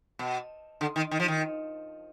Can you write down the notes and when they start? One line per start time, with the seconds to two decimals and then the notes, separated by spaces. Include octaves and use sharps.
0.19 B2
0.81 D3
0.96 D#3
1.11 D#3
1.20 F3
1.28 D#3